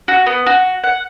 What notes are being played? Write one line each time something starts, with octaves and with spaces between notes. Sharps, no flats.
F#4
B3
F#4
F#5